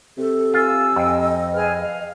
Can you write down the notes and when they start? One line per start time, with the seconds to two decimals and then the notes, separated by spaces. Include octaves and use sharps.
0.18 C3 A4
0.54 F4 G#5 E6
0.96 F2 D#5
1.52 G#4 B4 F6
1.79 F5